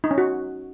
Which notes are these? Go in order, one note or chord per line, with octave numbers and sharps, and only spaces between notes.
D#4
C#4
F#4